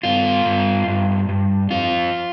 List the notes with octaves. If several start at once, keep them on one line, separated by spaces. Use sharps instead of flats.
G2 F4
G2
G2
G2
F2 F4